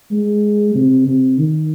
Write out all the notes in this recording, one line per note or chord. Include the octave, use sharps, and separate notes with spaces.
G#3
C3
C3
D#3